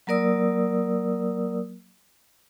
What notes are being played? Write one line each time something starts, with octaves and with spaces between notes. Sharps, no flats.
F#3 A#3 A#4 D5 D#6 E6